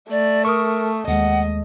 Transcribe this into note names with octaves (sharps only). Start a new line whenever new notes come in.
A3 D5
A#4 C#6 D#6
D#2 G#3 D#5 F#5